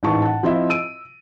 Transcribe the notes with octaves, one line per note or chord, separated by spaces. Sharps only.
A1 G#2 E3 A5 C#6
F#5 A5
F3 C4 E4 F4 D#5 E5
E6 D7 D#7